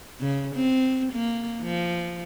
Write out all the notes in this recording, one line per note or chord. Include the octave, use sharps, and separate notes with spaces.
C#3
C4
A#3
F3